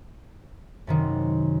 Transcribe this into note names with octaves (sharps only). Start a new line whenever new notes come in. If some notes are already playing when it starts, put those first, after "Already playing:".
F#2 C3 D#3